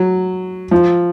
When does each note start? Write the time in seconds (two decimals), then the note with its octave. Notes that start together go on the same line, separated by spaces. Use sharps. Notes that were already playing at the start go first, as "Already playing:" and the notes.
Already playing: F#3
0.71 F3